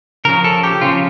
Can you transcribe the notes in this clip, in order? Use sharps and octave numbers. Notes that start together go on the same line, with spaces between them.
C#3 F3 C#4 A#4
A4
G4
C#3 F3 C#4 F4